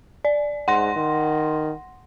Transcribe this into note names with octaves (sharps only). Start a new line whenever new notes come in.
D5
G#2 F#5 C6 A#6
D#3